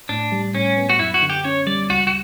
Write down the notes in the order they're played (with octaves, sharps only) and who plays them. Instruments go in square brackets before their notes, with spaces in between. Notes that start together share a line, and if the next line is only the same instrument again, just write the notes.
[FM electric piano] A2 [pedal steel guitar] D4
[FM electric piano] G3
[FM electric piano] A2 [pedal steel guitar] C#4
[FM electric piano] B3
[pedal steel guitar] F#4
[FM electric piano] F#2 [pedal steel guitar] E4
[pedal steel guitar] F#4
[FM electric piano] D3
[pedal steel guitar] G4
[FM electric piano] C#4 [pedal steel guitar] C#5
[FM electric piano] G3 [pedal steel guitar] D5
[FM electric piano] C#2 [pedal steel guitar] F#4
[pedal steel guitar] F#4